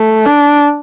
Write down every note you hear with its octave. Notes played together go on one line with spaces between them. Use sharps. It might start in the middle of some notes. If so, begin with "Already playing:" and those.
Already playing: A3
D4